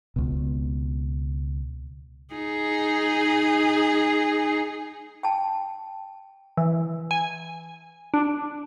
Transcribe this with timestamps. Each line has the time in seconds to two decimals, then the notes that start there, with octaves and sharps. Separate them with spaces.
0.16 C#2 B2
2.34 D#4 G#4
5.23 G5 A5
6.57 E3
7.11 G#5
8.14 D4